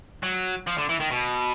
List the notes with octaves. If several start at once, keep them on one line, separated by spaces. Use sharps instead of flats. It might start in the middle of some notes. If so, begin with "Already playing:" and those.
F#3
F3
D3
E3
D#3
B2